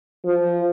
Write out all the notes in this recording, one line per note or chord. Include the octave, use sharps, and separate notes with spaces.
F3